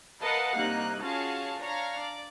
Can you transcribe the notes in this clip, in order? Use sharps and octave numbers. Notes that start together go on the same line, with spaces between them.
A#4 B4 D#5 F5 F#5 A5
C2 A#3 D#4 F#6
C#4 F4 F#4 G#4 F5 A5
D4 C#5 F5 A#5
D5